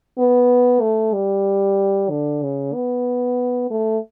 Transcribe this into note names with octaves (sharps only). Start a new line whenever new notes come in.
B3
A3
G3
D3
C#3
B3
A3